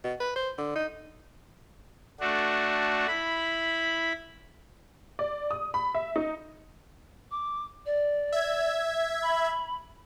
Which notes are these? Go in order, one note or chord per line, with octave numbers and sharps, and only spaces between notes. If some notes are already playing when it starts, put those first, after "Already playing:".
B2
B4
C5
D3
D#4
A3 D4 F#4
E4 B5
D5
D#6
B5
E5
D#4
D6
D5
E5 G#6
B5